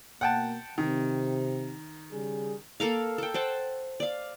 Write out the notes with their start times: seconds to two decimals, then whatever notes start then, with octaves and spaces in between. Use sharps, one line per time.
0.21 B2 A#3 F#5 G5 A5
0.78 C3 D#3 C4
2.12 C#3 G3 G#4
2.80 A#3 A4 A#4 F5
3.18 A4 G5
3.34 C5 F#5 G5 A5
4.00 D5 F5